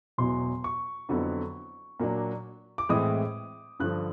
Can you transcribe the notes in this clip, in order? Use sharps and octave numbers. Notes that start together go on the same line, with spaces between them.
E1 E2 B2 F#3 C6
C#6
F2 D3 F#3 B3 E4
A#2 F#3 A#3 D4
D6
A2 E3 G#3 C4 D#6
G2 D3 F3 F#6